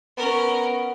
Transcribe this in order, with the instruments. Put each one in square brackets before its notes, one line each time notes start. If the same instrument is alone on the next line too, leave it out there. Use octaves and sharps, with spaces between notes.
[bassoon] B3 [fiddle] C#4 A#4